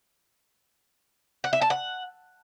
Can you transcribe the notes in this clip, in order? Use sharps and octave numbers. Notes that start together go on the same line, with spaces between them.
F#5
E5
A5
F#5